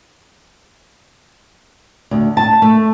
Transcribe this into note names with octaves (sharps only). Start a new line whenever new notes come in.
D2
A5
A3